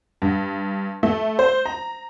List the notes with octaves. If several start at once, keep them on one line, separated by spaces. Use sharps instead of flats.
G2
A3
C5
A#5